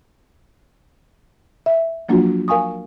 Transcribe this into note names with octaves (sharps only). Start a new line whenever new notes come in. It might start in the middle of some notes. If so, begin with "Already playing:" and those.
E5
F3 F#3 A#3 D4 F4 F#4
A#4 F5 G#5 C#6 D#6